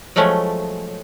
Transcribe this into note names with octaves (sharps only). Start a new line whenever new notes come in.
F3 F#3 G#3 A3 C#4